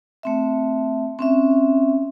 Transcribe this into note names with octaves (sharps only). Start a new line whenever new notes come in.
A3 C4 E5
C4 C#4 E5